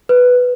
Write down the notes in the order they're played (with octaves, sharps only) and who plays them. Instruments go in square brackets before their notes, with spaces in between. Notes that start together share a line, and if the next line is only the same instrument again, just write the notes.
[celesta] B4